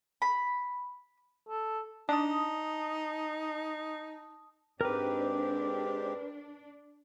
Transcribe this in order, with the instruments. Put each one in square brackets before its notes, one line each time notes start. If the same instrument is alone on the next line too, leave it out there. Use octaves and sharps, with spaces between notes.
[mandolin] B5
[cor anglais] A4
[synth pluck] D4 [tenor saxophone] D#4 [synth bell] A5 D#6
[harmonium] G#2 C4 G4 [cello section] D4 [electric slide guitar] A#4 B4